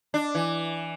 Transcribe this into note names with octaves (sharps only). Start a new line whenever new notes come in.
D4
E3